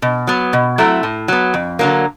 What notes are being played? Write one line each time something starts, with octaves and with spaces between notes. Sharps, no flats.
B2
F#3 B3
B2
F#3 A3 C4 E4
A2
F#3 B3
F2
D3 F#3 A#3